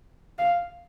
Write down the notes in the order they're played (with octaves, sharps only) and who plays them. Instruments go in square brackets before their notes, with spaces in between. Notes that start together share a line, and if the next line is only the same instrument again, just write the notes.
[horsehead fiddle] F5